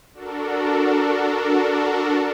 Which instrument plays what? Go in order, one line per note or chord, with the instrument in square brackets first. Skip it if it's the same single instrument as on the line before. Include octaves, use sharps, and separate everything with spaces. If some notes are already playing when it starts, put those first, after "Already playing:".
[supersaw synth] D4 F#4 A4 A#4